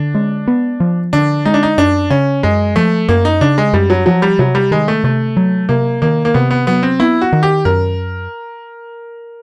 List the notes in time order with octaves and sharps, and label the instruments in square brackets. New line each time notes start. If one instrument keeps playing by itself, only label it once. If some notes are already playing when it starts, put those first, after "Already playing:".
Already playing: [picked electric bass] D3 [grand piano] D4
[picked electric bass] G#3
B3
F3
[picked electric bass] D3 [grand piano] D4
[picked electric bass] G#3 [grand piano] D#4
[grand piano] D4
D#4
[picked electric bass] F#2 [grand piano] D4
[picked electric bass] C#3 [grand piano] C#4
[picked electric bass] F#2 [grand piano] G#3
[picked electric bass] F3 [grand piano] A3
[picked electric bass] F#2 [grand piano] A#3
[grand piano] D#4
[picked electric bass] C#3 [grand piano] D4
[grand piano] G#3
[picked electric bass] F#2 [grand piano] G3
[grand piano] F#3
[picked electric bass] F3 [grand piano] F#3
[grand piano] G3
[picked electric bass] C3 [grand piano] F#3
[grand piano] G3
[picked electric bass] D#3 [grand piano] G#3
[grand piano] A3
[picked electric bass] C3 [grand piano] A3
[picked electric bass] F#3
[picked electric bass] C3 [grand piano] A#3
[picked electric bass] D#3 [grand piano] A#3
[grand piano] A#3
[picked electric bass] C3 [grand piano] B3
[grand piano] B3
[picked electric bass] F#3 [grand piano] B3
[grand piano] C4
[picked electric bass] B3 [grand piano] E4
[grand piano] F#4
[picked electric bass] D#3
[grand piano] G4
[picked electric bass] F#2 [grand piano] A#4